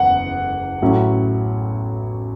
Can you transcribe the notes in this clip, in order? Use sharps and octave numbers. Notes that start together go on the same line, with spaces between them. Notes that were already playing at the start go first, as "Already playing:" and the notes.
Already playing: F#1 E2 F#5
A1 A2 F#3 C#4 E4